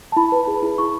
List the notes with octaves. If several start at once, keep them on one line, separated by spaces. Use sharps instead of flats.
A5
E4 B5
B4
G#4
E4
E4 C#6